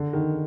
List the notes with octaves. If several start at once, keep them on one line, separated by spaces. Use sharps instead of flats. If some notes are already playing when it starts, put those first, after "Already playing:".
Already playing: D3
D#3